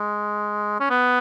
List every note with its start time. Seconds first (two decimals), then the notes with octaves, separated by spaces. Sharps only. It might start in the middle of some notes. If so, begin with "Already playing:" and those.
Already playing: G#3
0.80 C#4
0.91 B3